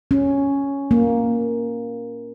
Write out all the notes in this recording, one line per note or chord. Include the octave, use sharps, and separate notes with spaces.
C#4
A#3